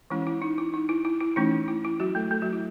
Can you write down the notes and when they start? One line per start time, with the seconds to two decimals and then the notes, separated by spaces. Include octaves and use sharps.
0.10 E3 G#3 C#4 E4
0.27 E4
0.42 D#4
0.58 E4
0.74 D#4
0.89 E4
1.05 E4
1.21 E4
1.36 E3 A3 C#4 D#4
1.68 E4
1.85 E4
2.00 F#3 F#4
2.15 A3 A4
2.31 A3 A4
2.42 F#3 F#4
2.53 E4